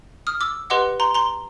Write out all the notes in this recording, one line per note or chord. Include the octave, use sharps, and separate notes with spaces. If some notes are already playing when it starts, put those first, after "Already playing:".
D#6 F6
D6 E6
G4 B4 D#5 F#5 C6 D6
A#5 C6
A#5 C6